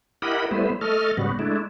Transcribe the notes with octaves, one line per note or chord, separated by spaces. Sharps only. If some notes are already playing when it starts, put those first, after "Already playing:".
E4 G4 A#4 D#5 F#5 B5
G3 A3 B3 E4 B4 C5
A3 A4 D#5 F6
G#2 C#3 G3 B3 F#4
G#3 A3 D4 E4